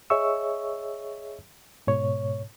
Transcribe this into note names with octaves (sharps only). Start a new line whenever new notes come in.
G#4 C#5 D#5 E5 C#6 E6
G#2 B2 C#5